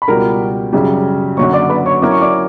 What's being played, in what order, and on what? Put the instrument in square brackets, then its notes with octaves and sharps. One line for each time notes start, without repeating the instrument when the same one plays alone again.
[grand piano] B5
[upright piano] C#2 B2 G3 [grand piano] A#4 A#5
[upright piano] F#2 C#3 G3
[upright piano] F#2 D3 F#3 A#3 [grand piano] C#5 C#6
[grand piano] D5 D6
B4 B5
C#5 C#6
[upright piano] F#3 C#4 E4 A#4 C#5 [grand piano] D6
[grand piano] C#6
D5 D6